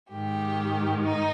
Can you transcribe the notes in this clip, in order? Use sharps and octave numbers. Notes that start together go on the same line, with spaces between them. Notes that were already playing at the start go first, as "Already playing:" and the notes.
G#2 D#3 G4
D#4